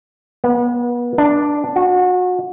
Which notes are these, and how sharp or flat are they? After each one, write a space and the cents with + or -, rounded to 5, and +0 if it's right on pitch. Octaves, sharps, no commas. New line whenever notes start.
B3 -35
D4 +0
F#4 -30